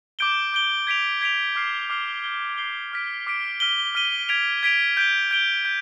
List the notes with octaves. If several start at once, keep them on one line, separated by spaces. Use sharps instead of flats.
D6 G6 D7 G7
D6 G6 D7 G7
G#6 B6 D7 F7
G#6 B6 D7 F7
D6 F6 C7 G7
D6 F6 C7 G7
G6 C7 G7
G6 C7 G7
D6 F6 B6 D7
D6 F6 B6 D7
F6 B6 D#7 G7
F6 B6 D#7 G7
G#6 B6 D7 F7
G#6 B6 D7 F7
G6 D7 G7
G6 D7 G7
G6